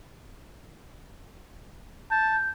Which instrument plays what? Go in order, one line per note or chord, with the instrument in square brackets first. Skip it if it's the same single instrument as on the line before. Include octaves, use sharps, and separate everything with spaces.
[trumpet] A5 [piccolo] G6